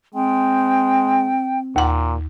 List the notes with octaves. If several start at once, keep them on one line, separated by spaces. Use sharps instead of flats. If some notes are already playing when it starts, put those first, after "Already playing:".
G#3 C4 G5
D#2 A#2 F#5